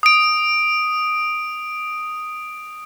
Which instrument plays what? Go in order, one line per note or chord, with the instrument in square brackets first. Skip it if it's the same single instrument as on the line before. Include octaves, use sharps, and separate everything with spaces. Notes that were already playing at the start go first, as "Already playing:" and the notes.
[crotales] D#6 D7